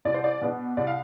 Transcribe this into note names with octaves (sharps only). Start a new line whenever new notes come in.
C2 D5
C5
D5
B2 B3 D4
C2 D5
F5